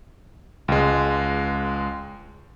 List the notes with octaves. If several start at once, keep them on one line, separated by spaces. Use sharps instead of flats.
C#2 G#3